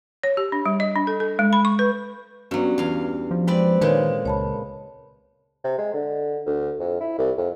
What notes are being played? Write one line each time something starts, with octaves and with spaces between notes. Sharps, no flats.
C#5
G4
D4
G3
D#5
D4
A4
A4
G#3
B5
C#6
B4
G2 F#3 B3 C#4 F#4
E2 F5
F3
G#3 C4 B4 D5
A#2 D#3 G#3 B4 C#5
C#2 C#5 A5 B5
C3
G#3
D3
D2
F2
E4
C2
F2